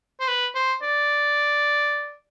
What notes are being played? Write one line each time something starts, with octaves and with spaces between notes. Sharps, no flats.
C5
B4
C5
D5